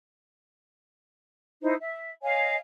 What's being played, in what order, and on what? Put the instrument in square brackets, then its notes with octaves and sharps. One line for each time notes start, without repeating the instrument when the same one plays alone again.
[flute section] D#4 E4 C5
E5
C#5 D#5 F5 G#5